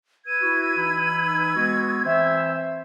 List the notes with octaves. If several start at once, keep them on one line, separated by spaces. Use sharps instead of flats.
B4 E6 G#6 D#7
E4 F#4
E3 D#4 B5
G#3 B3 F#4
E3 C4 C5 E5